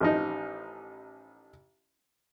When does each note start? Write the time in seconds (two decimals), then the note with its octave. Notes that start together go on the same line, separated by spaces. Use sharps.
0.01 A1 F3 D#4